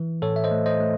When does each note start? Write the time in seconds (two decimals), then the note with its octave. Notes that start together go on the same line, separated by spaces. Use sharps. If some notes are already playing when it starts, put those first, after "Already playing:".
Already playing: E3
0.22 A2 A4 C#5
0.36 E5
0.44 C5 D#5
0.51 A3
0.66 C5 D#5
0.80 A3